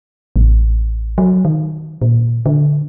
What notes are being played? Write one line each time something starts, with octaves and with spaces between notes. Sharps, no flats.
A1
F#3
D#3
A#2
D3